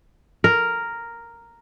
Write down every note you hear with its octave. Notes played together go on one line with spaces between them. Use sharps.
A#4